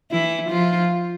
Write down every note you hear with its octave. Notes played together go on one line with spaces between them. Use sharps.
E3 E4
F3 F4